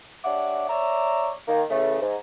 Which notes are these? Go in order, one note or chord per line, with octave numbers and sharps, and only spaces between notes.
G3 D4 C#5 E5 F#5 D6
C#5 D5 E5 A#5
D#3 A#3
C#3 E3 A3
G#2